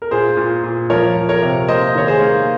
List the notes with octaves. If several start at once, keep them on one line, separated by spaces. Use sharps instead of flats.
A#4
A#2 G#4 C5
A#2
A#2
F3 A#4 C#5
F3
A#4 C#5
C3
A#3 C5 D#5
D#3 C#5
G#4 C5
A#3